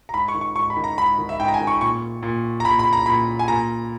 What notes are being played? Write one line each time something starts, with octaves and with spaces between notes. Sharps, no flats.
A#5
G#2 B5
C#6
D#3
C#6
G#2 C#6
B5
D#3
A#5
G#2 B5
D#3
E5
G#2 G5
A#5
G#5
D#3
C#6
A#2 C#6
A#2
A#5
A#2 B5
B5
A#5
A#2 B5
G#5
A#2 A#5